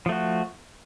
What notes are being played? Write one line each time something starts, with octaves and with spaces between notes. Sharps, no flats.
F3 A3 F#4